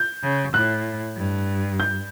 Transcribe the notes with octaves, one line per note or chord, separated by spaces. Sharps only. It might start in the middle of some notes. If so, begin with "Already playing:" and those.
Already playing: G6
C#3
A2 F#6
G2
G6